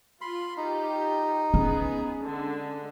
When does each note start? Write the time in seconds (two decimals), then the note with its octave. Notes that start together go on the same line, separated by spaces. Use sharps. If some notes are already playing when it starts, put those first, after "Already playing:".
0.21 F4 B5 C6
0.57 D#4 F4 G4
1.54 B3 C#4 G#4
2.22 D3 G#3 D4